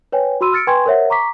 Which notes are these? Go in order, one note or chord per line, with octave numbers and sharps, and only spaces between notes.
B4 C#5 G5 G#5
F#4 B5 C6 E6 D#7
E6 F6 A6 C#7 D7
B4 G5 G#5 C6 C#6 G#6
A#4 C5 C#5 E5 F#5
A#5 C#6 D6 B6